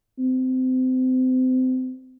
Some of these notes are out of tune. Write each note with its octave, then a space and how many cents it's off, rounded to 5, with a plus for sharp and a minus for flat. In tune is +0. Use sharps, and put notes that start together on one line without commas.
C4 -30